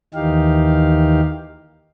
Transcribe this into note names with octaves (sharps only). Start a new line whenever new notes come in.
D#2 D#3 E3 D#4 G4 F5